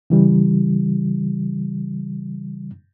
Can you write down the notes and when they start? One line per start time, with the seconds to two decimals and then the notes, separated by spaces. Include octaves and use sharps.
0.10 C#3 E3 G3